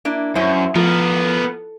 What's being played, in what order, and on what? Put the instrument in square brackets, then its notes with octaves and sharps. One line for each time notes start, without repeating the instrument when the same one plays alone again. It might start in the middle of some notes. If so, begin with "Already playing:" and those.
[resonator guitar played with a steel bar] A#3 D4 E4
[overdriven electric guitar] F#2 [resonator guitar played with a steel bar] C#4 E4 C5
[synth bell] F3 F4 [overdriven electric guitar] B3 A#4 [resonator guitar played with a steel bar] A4